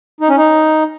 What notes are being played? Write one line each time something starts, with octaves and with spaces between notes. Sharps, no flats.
D#4
C#4
D#4